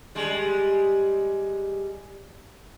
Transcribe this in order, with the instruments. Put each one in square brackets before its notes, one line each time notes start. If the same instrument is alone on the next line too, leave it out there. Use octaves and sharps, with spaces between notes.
[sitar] G3 G#3